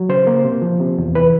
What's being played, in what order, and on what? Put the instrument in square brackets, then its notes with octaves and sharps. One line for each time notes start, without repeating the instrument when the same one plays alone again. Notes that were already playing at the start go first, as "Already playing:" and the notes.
Already playing: [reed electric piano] F#3
C#3 C5
A#3
C3
F3
C3
E2
E3 B4